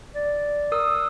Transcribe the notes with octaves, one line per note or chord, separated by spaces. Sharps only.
D5
A#4 D#6 E6